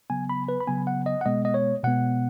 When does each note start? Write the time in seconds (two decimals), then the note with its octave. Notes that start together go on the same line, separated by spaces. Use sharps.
0.10 C#3 F#3 B3 G#5
0.29 B5
0.48 B4
0.61 B5
0.67 C#3 F#3 B3 G#5
0.87 F#5
1.06 D#5
1.21 F#5
1.25 B2 G#3 B3 D#5
1.45 D#5
1.54 C#5
1.83 B2 G#3 B3 F#5